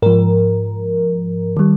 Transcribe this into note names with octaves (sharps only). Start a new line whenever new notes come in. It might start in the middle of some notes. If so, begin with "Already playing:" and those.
G#2 F3 A#4
D#3 G3